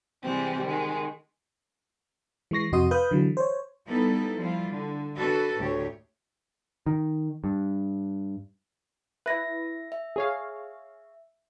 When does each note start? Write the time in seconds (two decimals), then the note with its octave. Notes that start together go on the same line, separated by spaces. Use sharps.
0.23 C3 E3 G3 G#3 C4
0.64 D#3 G#3
2.51 E3 G#3 C#6 A#6 C7
2.72 F2 C3 F#4 D#5 C6 D#6
2.91 B4 F5 D#6 F#6 G6
3.11 D3 E3 F#3
3.37 C5 C#5
3.87 G3 B3 D#4 E4 A4
4.39 F3 G3 E4 F4
4.71 D3
5.17 D4 F#4 A4 B4
5.58 D2 A2 G4 C#5
6.86 D#3
7.44 G2
9.26 E4 B4 E5 A#6
9.92 E5
10.16 G#4 C#5 F5